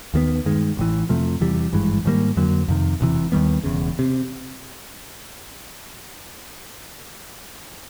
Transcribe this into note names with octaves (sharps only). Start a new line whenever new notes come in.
D#2 D#3 G#3 B3
G2 D#3 G#3
A1 A2 E3
F2 C3 F3 A3
E2 C3 E3 G3
G#1 G2 E3 G#3
G#2 D#3 G3 A#3
F2 D3 F#3 A#3
F2 C3 D#3
E1 D2 C3 E3
D#2 D#3 G3 B3
E1 E2 C#3
C3